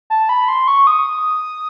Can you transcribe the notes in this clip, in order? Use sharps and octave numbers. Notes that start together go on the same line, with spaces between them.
A5
B5
C6
C#6
D#6